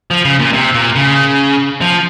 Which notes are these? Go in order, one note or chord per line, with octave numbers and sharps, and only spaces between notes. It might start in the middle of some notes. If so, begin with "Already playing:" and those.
F3
C#3
A#2
C3
A#2
C#3
F3